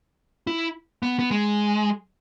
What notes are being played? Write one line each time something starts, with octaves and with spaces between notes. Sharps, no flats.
E4
B3
B3
G#3